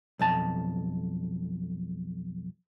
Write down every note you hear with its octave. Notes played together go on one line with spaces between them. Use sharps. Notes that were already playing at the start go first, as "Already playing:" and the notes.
B1 F2 A5